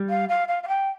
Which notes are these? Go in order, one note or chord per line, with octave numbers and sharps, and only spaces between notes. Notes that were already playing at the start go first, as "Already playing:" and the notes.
Already playing: G3
F5
F5
F5
F5
G5